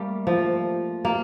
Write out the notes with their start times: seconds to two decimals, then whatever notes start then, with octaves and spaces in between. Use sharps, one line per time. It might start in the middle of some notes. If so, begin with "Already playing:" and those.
Already playing: G3 A3 A#3
0.27 F3
1.05 A#3